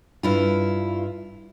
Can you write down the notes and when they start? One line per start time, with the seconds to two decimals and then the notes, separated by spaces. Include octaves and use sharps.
0.23 G2 E4 F4